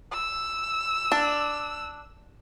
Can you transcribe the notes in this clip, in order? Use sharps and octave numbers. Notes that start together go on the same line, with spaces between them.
E6
D4